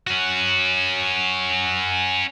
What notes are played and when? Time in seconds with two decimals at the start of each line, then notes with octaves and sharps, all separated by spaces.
0.07 C#4 F#4